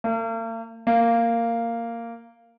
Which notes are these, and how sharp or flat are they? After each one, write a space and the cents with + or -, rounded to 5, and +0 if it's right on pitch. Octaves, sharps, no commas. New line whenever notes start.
A#3 -45
A#3 -10